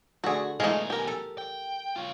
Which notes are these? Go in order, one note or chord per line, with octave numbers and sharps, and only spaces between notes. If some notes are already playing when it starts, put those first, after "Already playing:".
D3 A3 F#4 G#4
B1 E3 G#3 A3 D#4 F4 G#5
G4 A#4
A4
G5
F4 C#5